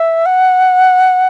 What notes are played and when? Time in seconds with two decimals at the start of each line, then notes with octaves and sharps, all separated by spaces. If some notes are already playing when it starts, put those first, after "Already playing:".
Already playing: E5
0.26 F#5